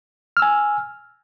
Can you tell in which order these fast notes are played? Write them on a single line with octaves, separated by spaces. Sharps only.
F6 E6 G#5